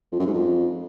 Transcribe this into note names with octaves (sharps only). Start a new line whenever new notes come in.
F2
F#2
G#2
F2